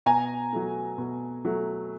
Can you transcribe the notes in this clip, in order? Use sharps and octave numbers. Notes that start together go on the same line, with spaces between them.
B2 G#5 A#5
F#3 A3
B2
F#3 A3